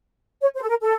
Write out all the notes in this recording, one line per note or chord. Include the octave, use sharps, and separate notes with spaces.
C#5
C5
A4
A#4
A4